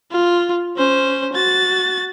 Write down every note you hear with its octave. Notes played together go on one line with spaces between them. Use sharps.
F4
C#4 C5
F#4 A6